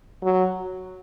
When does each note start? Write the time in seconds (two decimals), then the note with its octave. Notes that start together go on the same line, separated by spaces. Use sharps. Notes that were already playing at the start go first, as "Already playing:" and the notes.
0.24 F#3